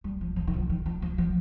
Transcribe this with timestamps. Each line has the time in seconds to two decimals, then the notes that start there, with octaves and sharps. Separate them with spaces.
0.04 G3
0.21 F3
0.36 F3
0.47 D#3
0.54 F3
0.69 D#3
0.86 F3
1.02 F3
1.18 F3